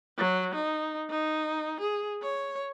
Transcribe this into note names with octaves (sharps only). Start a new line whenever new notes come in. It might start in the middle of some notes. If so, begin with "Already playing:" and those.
F#3
D#4
D#4
G#4
C#5